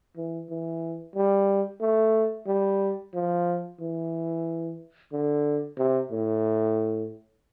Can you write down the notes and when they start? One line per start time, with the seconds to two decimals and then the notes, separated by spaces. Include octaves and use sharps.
0.16 E3
0.50 E3
1.16 G3
1.81 A3
2.47 G3
3.14 F3
3.80 E3
5.12 D3
5.78 C3
6.12 A2